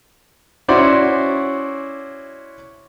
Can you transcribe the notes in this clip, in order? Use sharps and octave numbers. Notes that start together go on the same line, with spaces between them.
C#4 E4 F#4 C5 D5